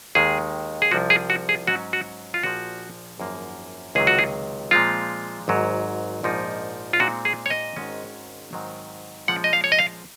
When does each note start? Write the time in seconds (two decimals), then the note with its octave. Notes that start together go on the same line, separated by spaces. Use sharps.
0.15 D#2 D#3 G#3 G#4
0.82 G#4
0.91 C2 C3 F3 F#4
1.10 G#4
1.30 F#4
1.49 G#4
1.67 G#2 F#3 C#4 F#4
1.93 F#4
2.34 F4
2.43 A#1 A#2 F3 F#4
3.19 G#1 F#2 F3 A#3
3.95 C#2 C3 D#3 F#3 G#4
4.07 F#4
4.19 G#4
4.71 A#2 F3 G#3 C4 F4
5.48 G#1 G#2 F#3
6.23 A#1 G#2 F3 A#3 D#4
6.93 F4
7.00 A#2 G#3 C4 D#4 F#4
7.25 G#4
7.46 C#5
7.50 D#5
7.76 G#1 G#2 D#3 G#3 C#4
8.53 G#2 D#3 F#3 C4
9.28 A#2 F3 G#3 C#4 F#5
9.44 D#5
9.53 F5
9.64 C#5
9.72 D#5
9.79 F5